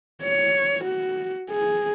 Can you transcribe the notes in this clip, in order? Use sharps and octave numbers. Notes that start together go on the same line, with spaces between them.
C#5
F#4
G#4